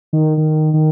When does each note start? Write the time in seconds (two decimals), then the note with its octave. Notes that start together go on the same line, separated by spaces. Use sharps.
0.13 D#3
0.37 D#3
0.74 D#3